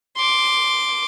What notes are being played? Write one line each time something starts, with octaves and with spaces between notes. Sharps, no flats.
C6 D6